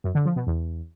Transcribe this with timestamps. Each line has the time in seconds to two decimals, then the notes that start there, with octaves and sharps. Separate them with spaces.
0.04 F#2
0.15 D3
0.25 F3
0.36 B2
0.47 E2